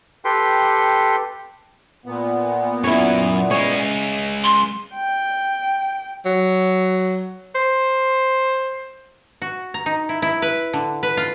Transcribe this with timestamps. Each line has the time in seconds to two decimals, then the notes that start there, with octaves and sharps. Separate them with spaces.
0.25 G4 A4 B4 G5 C6
2.06 A#2 B3
2.84 F#2 F#3 E4 C#5
3.51 G#3 C#4 C#5
4.44 C6
4.95 G5
6.25 F#3
7.55 C5
9.42 F#4
9.74 A#5
9.86 D#4
10.09 E4
10.22 E4
10.42 B4
10.73 D3
11.03 B4
11.17 F4